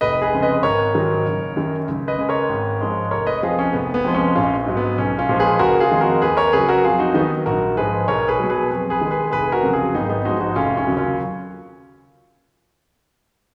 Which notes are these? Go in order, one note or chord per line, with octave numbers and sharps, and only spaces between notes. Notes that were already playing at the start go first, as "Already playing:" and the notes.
F1 B4 D#5
G#4 B4
F2 C#3 G#3
B4 D#5
G#1 A#4 C#5
G#2 D#3 F#3
F#1
F#2 D#3
C#2
B4 D#5
C#3 G#3
A#4 C#5
G#1
G#2 F3 G#3
F1 A#4 C#5
B4 D#5
F2 F3 F4 G#4
C#4
F1 B3
B3
F2 F3 G#3
C#4
A#1 C#4 F4
G#2 F#3
B3
B1 C#4
C#4 F4
A#2 F3 G#3
G#4 B4
F#1 F#4 A#4
F4 G#4
F2 D#3 G#3
F#4 A#4
D#2 G#4 B4
A#4 C#5
C#3 F#3 G#4 B4
F#4 A#4
F2 F4 G#4
D#4 F#4
D#3 F#3 B3 D#4
A#1 F#4 A#4
G#2 F3 G#3 G#4 B4
B1 A#4 C#5
G#4 B4
B2 F#3
G#4 B4
F2
G#4 B4
D#3 G#3
G#4 B4
F1 G#4 B4
F#4 A#4
F2 C#3 F#3
F4 G#4
G#1 B3 D#4
B3 D#4
G#2 F3 G#3 D#4 F#4
D#4 F#4
F1 C#4 F4
C#4
D#2 C#3 F#3
C#4 F4